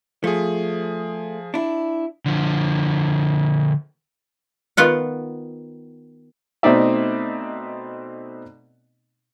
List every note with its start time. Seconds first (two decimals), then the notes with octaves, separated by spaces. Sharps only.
0.24 F3 A3 G#4
1.54 D4 E4
2.26 D3 F3
4.77 D#3 B3 F4 F#5
6.63 B2 A3 C4 D#4 D5 E5